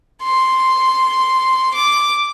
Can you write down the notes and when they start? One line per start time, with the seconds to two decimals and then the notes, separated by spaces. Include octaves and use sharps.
0.23 C6
1.75 D6